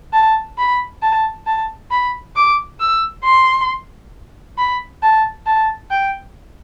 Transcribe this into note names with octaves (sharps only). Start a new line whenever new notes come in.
A5
B5
A5
A5
B5
D6
E6
C6
B5
A5
A5
G5